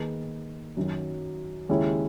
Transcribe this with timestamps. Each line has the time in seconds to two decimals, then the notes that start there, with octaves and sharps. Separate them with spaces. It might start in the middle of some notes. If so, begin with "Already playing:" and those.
Already playing: D#3 A#3 D#4 G#4 B4
0.77 F#2 D#3 F#3
1.69 D#2 C#3 G#3 C#4 E4